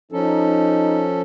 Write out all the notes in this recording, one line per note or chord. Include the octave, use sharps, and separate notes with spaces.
F3 C#4 D#4 A4